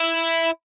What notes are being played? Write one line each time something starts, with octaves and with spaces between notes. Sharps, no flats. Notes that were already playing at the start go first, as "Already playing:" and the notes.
Already playing: E4